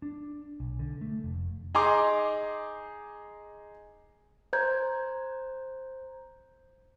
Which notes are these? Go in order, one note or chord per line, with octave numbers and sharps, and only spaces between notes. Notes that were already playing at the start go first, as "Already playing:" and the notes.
D4
B1
D3
A3
F1
D#4 G#4 A#5 C6 D6
C5 A#5 G6 G#6